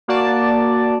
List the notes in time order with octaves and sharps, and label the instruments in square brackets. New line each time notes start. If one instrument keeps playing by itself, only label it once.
[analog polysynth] A#3 F#4 D5 A5